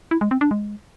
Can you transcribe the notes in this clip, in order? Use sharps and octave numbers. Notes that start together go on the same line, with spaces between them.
E4
G#3
C4
D4
G#3